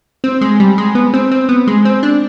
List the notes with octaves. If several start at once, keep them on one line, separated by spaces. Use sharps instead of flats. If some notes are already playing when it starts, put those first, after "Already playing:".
C4
G#3
G3
G#3
B3
C4
C4
B3
G#3
C4
D4